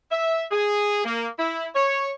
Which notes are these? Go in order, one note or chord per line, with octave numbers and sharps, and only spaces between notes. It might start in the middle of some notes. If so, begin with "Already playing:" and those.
E5
G#4
A#3
E4
C#5